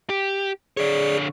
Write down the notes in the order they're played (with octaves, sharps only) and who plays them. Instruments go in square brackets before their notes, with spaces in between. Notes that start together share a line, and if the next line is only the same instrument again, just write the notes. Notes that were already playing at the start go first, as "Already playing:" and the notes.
[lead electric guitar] G4
[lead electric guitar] D3 C#5 [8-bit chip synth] G#4 D5